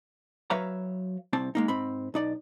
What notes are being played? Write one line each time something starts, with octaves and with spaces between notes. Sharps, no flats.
F#3 B4 C#5 E5 F5 A#5
C2 C4 A5
G#3 A#3 D#4
G#2 C4 B5
B1 D#4 D5